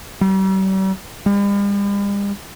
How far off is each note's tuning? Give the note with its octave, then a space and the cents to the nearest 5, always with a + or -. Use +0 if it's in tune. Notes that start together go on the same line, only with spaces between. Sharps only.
G3 -40
G3 +45